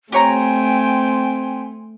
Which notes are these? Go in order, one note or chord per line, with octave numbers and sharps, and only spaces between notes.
A3 C4 G4 C#5 G5 G#5 A#5 C6